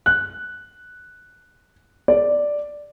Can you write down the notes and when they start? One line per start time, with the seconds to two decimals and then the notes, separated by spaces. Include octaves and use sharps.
0.06 F#6
2.08 D5